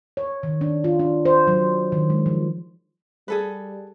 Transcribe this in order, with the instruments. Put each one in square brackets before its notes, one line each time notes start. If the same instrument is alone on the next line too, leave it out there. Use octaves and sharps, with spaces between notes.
[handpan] C#5
D#3
D4
F4
D4
C5
F#3
D#3
G#3
F3
[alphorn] G3 [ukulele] G#4 A4 B4